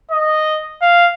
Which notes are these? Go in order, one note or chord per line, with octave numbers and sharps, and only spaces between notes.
D#5
F5